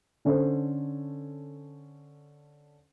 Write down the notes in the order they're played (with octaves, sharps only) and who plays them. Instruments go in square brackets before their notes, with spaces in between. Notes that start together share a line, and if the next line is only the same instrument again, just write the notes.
[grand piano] D3 C#4 A4 C5